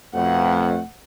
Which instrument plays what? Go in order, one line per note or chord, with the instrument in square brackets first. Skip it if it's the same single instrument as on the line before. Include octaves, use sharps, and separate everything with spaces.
[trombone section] F2 [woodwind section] B2 A3 [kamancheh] F#5